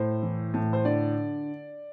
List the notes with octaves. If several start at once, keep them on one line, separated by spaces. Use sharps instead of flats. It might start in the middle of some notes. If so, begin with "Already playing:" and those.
Already playing: A2 C5
E3
A2
C5
D3 D5